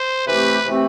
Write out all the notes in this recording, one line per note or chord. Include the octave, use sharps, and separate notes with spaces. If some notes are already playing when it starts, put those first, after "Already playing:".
Already playing: C5
C3 E3 A3 C4 G4 B4
C3 E3 A3 C4 G4